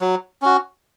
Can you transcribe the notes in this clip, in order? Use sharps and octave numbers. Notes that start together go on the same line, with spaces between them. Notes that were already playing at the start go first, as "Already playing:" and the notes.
F#3
C#4 F#4